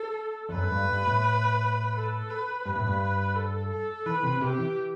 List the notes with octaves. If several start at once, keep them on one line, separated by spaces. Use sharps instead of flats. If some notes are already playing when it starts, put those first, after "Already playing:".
Already playing: A4
E2
F#2 B4
G2
G2
A2
A4
B4
G2 B4
A2
G2
A4
A4
E3 B4
C3
C3 G4
E3